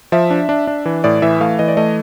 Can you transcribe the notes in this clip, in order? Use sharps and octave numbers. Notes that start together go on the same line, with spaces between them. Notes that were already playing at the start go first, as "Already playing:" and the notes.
F3 E5
D4
D4
D4
E3
A2 D5
E3 E5
A3 F5
E3 D#5
D5
A3 D#5